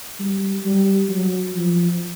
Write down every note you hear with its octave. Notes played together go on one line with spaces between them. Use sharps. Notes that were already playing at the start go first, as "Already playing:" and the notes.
G3
G3
F#3
F3